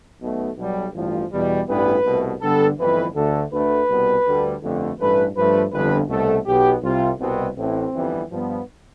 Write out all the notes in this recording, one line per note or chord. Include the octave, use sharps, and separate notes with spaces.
B1 B2 A3
B1 B2 G3
A1 G2 F3
E2 B2 G3
A1 G2 E3 G3 B3 B4
C2 B2 A3
G2 D3 G3 B3 A4
G1 F2 E3 B4
D2 D3 A3 A4
D2 D3 A3 B4
C2 B2 G3 B3
D2 D3 G3
G1 F2 D3 A3
A1 G2 E3 A3 B4
G2 F3 A3 B4
G1 F2 D3 B4
C2 B2 A3 A4
B1 B2 B3 G4
C2 C3 G3 F4
C2 B2 B3 C4
A1 A2 E3 C4
G1 F2 E3 G3 B3
G2 F3 B3